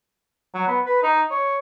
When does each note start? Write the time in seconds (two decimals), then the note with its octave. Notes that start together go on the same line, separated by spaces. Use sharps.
0.54 F#3
0.68 B3
0.86 B4
1.03 D#4
1.31 C#5